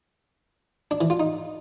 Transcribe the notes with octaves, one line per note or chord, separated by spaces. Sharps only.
D4
E3
F4
D#4